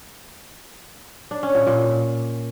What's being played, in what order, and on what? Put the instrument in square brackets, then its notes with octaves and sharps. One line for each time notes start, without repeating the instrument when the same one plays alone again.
[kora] D4
C#4
A#2
A#2